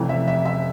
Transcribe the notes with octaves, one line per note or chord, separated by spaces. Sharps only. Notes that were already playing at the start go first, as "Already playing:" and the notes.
Already playing: F1 F2 E3 A3
E5
E5
E5